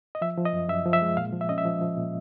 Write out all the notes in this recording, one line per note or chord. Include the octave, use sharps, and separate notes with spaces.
D#5
F3 E5
F3
D#5
F#2
F#2 E5
F3
E5
G#3
A#2 F5
F3
E5
C#4 D#5
E5
F3
F3
A#2